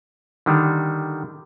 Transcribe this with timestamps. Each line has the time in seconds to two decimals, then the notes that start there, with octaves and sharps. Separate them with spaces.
0.46 D3 D#3 G3